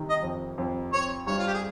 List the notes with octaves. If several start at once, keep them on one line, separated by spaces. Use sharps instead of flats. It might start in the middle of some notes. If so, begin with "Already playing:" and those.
Already playing: C3 D#3
D#5
F2
F2
C4 C#5
G2 C#5
F4
G4
G#4